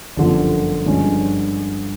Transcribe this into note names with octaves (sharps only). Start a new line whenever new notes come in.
G1 F#2 D3 F3
G2 D3 F3 G#3 C#4